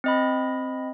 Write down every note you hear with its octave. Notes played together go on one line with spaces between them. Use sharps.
C4 D#5 B5